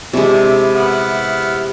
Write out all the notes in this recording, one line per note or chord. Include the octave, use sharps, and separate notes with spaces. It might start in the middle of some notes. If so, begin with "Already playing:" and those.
C3 G#3 D4 E4
B3 E4 F6